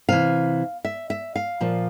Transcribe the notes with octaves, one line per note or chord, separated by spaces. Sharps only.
C3 E3 F5
E5
E5
F5
A#2 F3